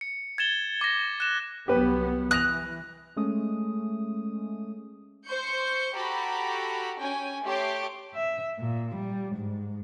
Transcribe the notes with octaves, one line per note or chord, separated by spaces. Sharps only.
C#7
G#6 A6 E7 G7
D6 A#6
F#6 E7
C2 F#3 B3 G4 B4
E3 D#6 F#6 A#6 F7
G#3 A3 C#4 D#6
C5 C#6 G6 C#7
F#4 G4 A4 A#5 B5
C#4 G5 G#5
A3 G4 C#5 C6 D6
E5
A#2
G3
G#2